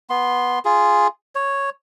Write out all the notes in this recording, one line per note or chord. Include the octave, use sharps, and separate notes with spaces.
B3 C6
F4 G#4
C#5